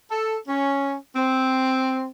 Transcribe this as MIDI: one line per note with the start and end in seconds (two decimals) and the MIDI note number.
0.11 0.37 69
0.48 0.96 61
1.16 2.07 60